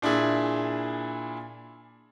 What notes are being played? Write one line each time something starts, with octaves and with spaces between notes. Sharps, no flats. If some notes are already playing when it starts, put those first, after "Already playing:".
A#2 D4 E4 G#4